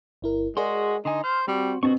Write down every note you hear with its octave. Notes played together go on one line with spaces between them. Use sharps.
G1 E4 A#4
G#3 F#4 G#4 A#4 D5 F#5 C6
D3 D#4 G#5 C6
C5 F6
G3 C4 F#4
B2 C4 F#4 A5 C#6